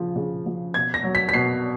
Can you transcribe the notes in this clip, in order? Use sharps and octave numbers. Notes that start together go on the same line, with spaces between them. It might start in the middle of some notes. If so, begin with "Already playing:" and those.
Already playing: C#3 F3
C#3
F3
B2 G#6
A#6
F#3
B6
B6
B2 C7